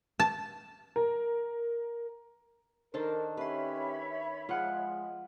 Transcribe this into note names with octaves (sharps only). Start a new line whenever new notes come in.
A5
A#4
D#3 D4 A4 A#4 C5
C#4 G4 B4 C#5 E5 B5 C6
F3 G#3 F4 F#5 F6